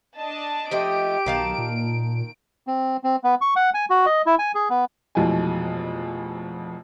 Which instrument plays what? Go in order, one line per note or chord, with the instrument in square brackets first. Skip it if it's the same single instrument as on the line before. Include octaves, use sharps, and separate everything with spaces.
[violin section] D4 D#5 A5
[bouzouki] F3 A3 D#5 [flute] G4 [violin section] D7
[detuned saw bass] B1 [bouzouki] D#3 F5 A5
[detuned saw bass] A#2
[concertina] C4
C4
B3
C#6
F#5
G#5
F#4
D#5
E4
G#5
G#4
B3
[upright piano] F1 F2 B2 E3 G#3 G#5